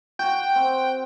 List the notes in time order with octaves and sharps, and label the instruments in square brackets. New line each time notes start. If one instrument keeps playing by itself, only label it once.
[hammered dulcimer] F#4 [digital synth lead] G5
[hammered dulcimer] C4